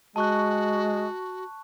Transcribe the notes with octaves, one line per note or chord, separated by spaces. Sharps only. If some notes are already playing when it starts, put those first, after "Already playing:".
G#3 F#4 A5 C#6 F#6